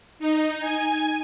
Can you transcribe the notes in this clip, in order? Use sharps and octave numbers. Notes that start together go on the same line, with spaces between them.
D#4
G#5